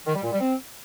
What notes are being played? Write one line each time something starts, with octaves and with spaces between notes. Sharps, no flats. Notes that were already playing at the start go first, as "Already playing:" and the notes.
D#3
G3
A#2
G3
C4